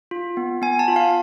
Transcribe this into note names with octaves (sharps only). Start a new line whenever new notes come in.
F4
B3
B3 G#5
A5
F4
F5